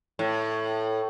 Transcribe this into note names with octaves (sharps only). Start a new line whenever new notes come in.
A2